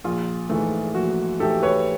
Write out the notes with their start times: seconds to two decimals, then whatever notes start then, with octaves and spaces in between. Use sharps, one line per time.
0.04 A#1 F4
0.50 G#2 E3 A3
0.95 A#1 F#4
1.40 G#2 E3 A3 G4 A4
1.62 B4 C#5